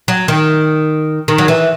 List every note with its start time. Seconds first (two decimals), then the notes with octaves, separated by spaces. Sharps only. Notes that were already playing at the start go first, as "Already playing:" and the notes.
0.08 F#3
0.28 D#3
1.28 D#3
1.38 F#3
1.48 E3